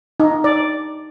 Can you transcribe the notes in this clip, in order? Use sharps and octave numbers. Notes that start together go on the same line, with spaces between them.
D#4
D5